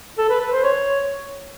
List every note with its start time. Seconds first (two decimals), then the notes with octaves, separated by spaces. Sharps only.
0.18 A4
0.30 B4
0.41 B4
0.52 C5
0.64 C#5